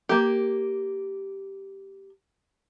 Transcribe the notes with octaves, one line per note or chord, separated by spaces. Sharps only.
A#3 G4